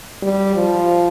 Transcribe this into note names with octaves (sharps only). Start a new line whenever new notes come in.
G3
F3